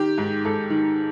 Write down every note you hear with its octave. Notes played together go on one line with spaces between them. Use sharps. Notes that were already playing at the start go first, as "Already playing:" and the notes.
Already playing: D#3 G4
G#2
G#2 A4
D#3